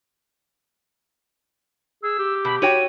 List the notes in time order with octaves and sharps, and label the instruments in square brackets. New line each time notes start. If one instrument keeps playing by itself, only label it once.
[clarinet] G#4 [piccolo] E6
[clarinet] G4
[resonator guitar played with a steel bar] B2 [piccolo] B5
[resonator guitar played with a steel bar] F#4 C#5 G5 [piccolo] D#7